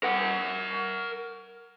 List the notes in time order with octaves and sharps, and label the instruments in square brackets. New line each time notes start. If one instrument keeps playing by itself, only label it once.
[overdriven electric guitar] A#4 F#5